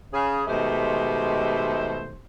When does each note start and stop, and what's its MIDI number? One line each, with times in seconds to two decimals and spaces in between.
0.13 0.41 49
0.13 0.41 68
0.47 2.17 47
0.47 2.17 51
0.47 2.17 56
0.47 2.17 57
0.47 2.17 67
0.47 2.17 72